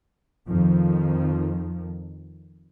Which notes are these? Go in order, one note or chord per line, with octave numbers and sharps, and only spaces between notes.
F2 D#3 F3